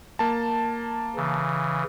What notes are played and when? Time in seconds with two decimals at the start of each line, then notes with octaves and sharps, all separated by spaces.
0.19 A#3 A5
1.16 C#3 E3